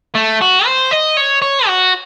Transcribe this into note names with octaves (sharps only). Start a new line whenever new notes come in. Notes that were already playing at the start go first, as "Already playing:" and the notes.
A3
F#4
C5
D#5
C#5
C#5
F#4